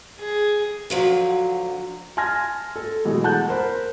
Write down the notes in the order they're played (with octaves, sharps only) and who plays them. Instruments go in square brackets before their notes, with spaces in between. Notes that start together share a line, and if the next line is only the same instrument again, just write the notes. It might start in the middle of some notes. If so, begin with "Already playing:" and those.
[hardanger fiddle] G#4
[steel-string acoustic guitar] D3 F3 F#3
[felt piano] G#5 A5 C6 F6 G#6 A#6
A4
B2 E3 F#3 G#3 A3
F#5 A5 F#6 G6
A#4 C5 B5